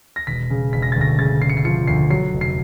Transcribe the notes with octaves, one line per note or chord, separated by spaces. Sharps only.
A#6
E1 B6
C#3
E1 B6
A#6
D2 A6
A#6
C#3 A6
C#3 C7
C#7
C7
F3 C#7
D2 C7
F#3 C7
F1
C7